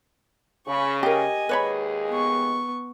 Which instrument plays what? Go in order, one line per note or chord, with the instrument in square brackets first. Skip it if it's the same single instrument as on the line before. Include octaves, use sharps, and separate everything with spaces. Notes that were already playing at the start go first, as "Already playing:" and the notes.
[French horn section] C#3 [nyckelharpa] B5 C#6
[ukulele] G4 A#4 [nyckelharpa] D#5 G#5
[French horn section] D#2 G#3 G#4 [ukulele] B4 C#5 B5
[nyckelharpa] B3 C#6